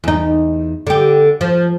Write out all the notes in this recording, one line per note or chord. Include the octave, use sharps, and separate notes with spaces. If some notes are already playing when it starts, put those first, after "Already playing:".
E2 D#4
D3 G4
F3